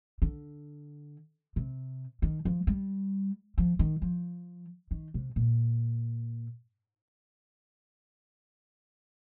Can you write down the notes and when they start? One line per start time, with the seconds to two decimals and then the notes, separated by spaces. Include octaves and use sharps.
0.22 D3
1.56 C3
2.22 D#3
2.45 F3
2.67 G3
3.58 F3
3.79 D#3
4.02 F3
4.91 D#3
5.14 C3
5.36 A#2